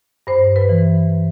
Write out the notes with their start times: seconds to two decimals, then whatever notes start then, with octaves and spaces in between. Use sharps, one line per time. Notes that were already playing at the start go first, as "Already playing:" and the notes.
0.27 G2 C5
0.56 B4
0.69 E3